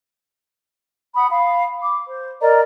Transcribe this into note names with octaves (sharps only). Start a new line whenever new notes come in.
F#5 B5 D#6
F5 B5
D6
C5
A#4 D5 D#5 A#5